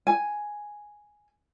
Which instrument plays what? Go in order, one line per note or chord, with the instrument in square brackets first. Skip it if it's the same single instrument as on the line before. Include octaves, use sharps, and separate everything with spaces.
[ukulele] G#5